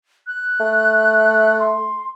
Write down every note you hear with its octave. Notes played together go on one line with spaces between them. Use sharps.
F#6
A3
C6